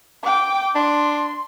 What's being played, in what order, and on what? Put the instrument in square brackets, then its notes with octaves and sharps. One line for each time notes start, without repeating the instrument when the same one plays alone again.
[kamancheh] G5 D6
[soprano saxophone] D4 [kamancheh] C6